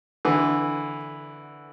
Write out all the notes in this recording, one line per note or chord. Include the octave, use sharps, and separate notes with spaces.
D3 E3